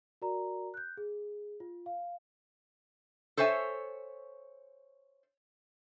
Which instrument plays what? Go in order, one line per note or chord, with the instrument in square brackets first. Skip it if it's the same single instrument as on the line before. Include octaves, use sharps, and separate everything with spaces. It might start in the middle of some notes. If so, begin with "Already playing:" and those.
[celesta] F#4 A#4 D5 A#5
F#6 G6
G#4
F4
F5
[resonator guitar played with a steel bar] A4 C5 C#5 E5 G#5